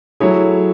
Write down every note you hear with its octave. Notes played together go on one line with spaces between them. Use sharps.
F#3 A3 E4 G#4 C#5